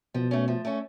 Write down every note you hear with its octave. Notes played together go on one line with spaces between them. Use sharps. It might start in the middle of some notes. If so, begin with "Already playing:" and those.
B2 F3
A3 C#4
F3
A3 C#4